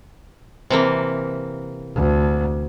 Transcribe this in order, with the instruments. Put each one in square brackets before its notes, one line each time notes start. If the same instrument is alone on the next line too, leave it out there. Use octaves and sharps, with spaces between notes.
[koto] C3 E3 A#3
[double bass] D2